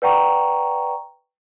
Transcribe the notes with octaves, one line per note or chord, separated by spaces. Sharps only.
B4 D5 F#5 G5 A#5 C#6